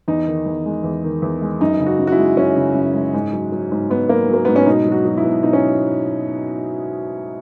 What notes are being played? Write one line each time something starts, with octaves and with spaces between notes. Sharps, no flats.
E2 D#4
D#3
E2
G#3
E2
D#3
E2
G#3
F#2 D#4
C#3
F#4
F#2
F#4
E4
G#3
F#2 C#4
C#3
F#2
G#3
G#2
F#3
F#3
G#2
G#2 B3
F#3 A#3
F#3
A#3
G#2 B3
C#4
B2 D#4
F#3
F#4
F#3
E4
B2
B2 D#4
C#4